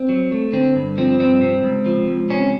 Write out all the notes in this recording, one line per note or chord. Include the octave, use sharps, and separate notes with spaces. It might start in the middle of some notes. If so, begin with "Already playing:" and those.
Already playing: C4
F#3
A3
D3 C4
G2
F3 C4
G2 C4
C3
C#2
F3
C#2
C3 C#4